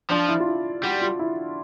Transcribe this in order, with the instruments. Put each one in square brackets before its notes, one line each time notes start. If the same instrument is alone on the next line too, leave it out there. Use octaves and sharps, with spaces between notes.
[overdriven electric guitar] F3 [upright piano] D4
[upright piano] E4
F4
E4
[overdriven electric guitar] G3 [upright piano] F#4
[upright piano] F4
E4